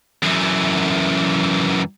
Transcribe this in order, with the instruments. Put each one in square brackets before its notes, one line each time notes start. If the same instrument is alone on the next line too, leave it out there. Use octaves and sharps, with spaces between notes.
[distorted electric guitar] F#2 E3